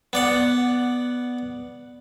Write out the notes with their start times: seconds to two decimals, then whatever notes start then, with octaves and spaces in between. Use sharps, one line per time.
0.13 B3 D5 F#5